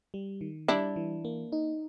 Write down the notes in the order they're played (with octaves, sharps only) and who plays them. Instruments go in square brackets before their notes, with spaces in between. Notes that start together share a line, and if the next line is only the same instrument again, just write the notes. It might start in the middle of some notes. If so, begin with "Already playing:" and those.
[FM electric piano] G3
D#3
[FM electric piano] G3 [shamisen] D4 E4
[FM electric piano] E3
A#3
D#4